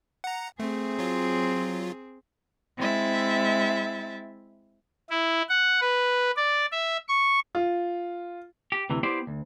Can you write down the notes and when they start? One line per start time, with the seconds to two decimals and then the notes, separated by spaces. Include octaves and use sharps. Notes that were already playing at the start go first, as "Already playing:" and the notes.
0.24 F#5 A#5
0.60 A3 C4 G#4
0.99 F#3 F4
2.78 G#3 C4 E4 E5 A6
5.10 E4
5.49 F#5
5.81 B4
6.36 D5
6.72 E5
7.08 C#6
7.55 F4
8.72 G4
8.90 D2 C3 E3
9.03 B3 E4 G4 C5 D5
9.27 D2